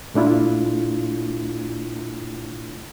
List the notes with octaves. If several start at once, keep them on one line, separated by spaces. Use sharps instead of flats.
A#2 A3 D4 E4 F4